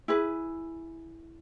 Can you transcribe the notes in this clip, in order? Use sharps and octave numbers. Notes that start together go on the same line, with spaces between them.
E4 G#4 B4